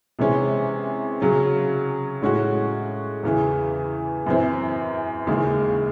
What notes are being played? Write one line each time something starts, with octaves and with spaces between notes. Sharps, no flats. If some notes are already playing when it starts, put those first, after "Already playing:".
C3 E3 G#3 C#4
C#3 F#3 C#4
A2 G#3 C#4 F#4
E2 C#3 E3
F#2 E3 C4
D#2 C#3 E3 G#3